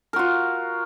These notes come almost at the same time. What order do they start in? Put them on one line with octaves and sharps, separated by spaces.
A#4 F#4 F4